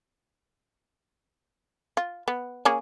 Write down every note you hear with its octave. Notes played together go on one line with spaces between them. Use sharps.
F4
B3
A#3 C#4 G#4